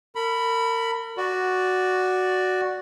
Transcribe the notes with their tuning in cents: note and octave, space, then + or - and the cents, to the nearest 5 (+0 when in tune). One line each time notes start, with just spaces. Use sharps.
A#4 -35 B5 +0
F#4 +0 D5 +0